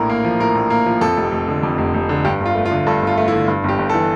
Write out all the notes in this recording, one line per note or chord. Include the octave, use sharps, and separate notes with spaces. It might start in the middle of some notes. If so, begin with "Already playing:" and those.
Already playing: A#1 A2 A#4
A#3
F3
A2 A#4
A#1
A#3
F3
F2 A4
F1
F1
D3
F2
F1
F1
D3
G2 G4
G1
F4
A3
F4
D3
G2 A4
G1 F4
A3
E4
D3
G2
G1 G4
G1
A4
E3